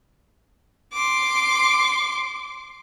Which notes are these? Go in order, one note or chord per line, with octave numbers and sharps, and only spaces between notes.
C6 D6